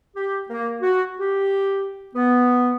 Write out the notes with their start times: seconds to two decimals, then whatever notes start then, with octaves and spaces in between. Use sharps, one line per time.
0.16 G4
0.49 A#3
0.82 F#4
1.19 G4
2.16 B3